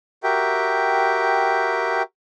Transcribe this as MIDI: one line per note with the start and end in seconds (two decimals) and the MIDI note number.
0.24 2.02 66
0.24 2.02 67
0.24 2.02 70
0.24 2.02 76
0.24 2.02 79